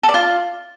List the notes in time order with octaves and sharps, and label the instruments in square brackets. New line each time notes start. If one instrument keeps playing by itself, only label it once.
[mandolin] A4
D5
F4